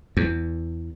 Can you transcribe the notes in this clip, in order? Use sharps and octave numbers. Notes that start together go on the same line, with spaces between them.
E2